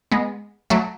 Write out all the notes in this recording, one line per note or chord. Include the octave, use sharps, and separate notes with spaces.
G#3 B3
F#3 A3